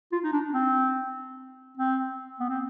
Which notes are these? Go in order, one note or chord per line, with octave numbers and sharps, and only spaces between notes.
F4
D#4
D4
C4
C4
B3
C4